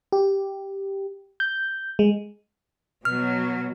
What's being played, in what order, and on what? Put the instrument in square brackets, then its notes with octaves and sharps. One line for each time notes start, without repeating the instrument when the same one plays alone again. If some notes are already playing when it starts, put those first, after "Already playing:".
[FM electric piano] G4
G6
G#3
[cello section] B2 F#3 [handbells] F6